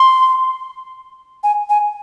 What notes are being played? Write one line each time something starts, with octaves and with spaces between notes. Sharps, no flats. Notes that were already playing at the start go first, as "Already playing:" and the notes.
Already playing: C6
G#5
G#5